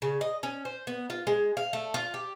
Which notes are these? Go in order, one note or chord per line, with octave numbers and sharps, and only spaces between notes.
C#3
D#5
C#4
C5
B3
F4
G#3
F5
A3
F4
G4